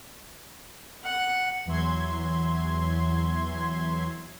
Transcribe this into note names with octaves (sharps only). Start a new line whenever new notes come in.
F#5
E2 E3 F#3 E5 C6 G#6